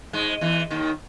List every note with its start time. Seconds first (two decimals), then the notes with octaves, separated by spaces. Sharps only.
0.13 G#2 G#3
0.41 E2 E3
0.70 D#2 D#3